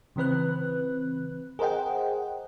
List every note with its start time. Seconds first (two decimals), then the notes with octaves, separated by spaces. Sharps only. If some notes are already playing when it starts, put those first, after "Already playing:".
0.16 C#3 E3 C4 B4 F#6
1.59 G#4 A#4 C5 D#5 F#5 G5